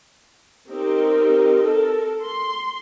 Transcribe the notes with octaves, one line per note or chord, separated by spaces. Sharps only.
C4 D#4 G4 A#4
A4 A#4
C6